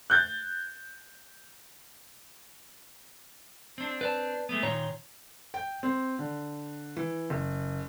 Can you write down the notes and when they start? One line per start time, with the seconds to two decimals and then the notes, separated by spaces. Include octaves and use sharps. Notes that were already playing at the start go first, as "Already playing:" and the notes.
0.10 F#6 G6 A6
3.78 C4 D4
4.01 B4 D5 A5
4.49 G#3 A3 B3
4.63 A#2 D#3 F4 C#5 A#5
5.54 G5
5.83 C4
6.19 D3
6.97 E3
7.30 F#1